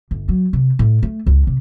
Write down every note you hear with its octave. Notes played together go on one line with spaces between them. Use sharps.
G1
F#3
C3
A2
A3
C#2
C3